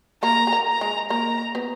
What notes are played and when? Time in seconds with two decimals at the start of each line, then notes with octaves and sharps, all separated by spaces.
0.23 A#3 A#4 A#5
0.47 G#4
0.53 A#3 A#4
0.68 A#5
0.81 G#3 G#4
1.10 A#3 A#4 A#5
1.55 B3 B4